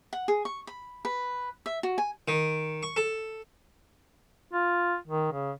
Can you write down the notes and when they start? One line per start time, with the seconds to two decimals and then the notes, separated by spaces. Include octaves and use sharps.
0.13 F#5
0.28 G#4
0.45 C#6
0.67 B5
1.05 B4
1.66 E5
1.83 F#4
1.98 G#5
2.28 D#3
2.83 C#6
2.96 A4
4.53 F4
5.07 D#3
5.32 C#3